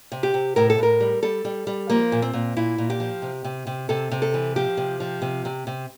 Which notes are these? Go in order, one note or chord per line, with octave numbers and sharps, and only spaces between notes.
C3
G4
C3
A2 A#4
A4
A2 A#4
G3
G3 A4
G3
G3
F3 A#3
A#2
C4
A#2
A#2 E4
A#2
G4
F3
C3
C3
C3
C3 A4
C3
A4
E3
F3 G4
C3
F3
C3
C3
C3